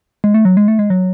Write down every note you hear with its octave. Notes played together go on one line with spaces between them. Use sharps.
G#3
A3
F#3
G#3
A3
G#3
F#3